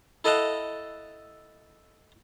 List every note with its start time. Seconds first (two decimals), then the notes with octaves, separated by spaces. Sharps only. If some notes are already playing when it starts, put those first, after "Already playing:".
0.24 E4 A4 D#5 F5 F#5 A5